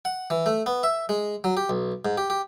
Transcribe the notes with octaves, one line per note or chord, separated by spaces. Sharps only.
F#5
E3
A3
B3
E5
G#3
F#3
G4
B1
G#2
G4
G4